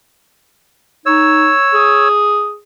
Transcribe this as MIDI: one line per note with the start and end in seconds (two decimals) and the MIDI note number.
1.06 1.52 63
1.06 2.08 73
1.06 2.08 88
1.74 2.58 68